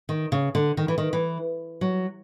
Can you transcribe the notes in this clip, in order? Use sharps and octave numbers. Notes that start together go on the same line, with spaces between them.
D#3
C#3
D3
D#3
E3
D#3
E3
F#3